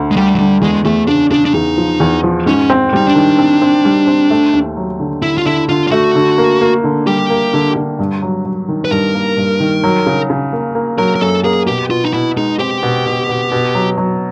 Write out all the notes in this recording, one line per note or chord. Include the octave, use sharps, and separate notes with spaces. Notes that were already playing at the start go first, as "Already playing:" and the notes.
Already playing: D2 D3
G#3
D2 G3
F#3
D3 G3
E2 G#3
E2 A3
C#3 D4
C#3 D4
D4
E2 D#4
F3
E2
F3
G#2 C#4
C4
G3 D#4
D4
D#3
C4
C4
G3
C4
A3
D#2
F#3
D3
D3 E4
F4
D3 E4
D3 F4
F4
A3 F#4
D3
A#3
A#3
D3
G3 G4
A#3
D3
D3
G2
F#3
F#3
D#3
B4
G2 A#4
A#3
G2
D#3
F#3
C#3
C#3
A#3
A#3
F#3 A#4
A#4
F#2 A4
A#3 G#4
B2 G4
B2 F4
D#4
B2 E4
G#3 D#4
C4 G4
B2
B2
B2
B2
F#3
F#3